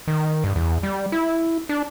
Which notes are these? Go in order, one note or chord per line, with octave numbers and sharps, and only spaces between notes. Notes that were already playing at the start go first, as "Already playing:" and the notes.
D#3
G2
E2
G3
E4
D4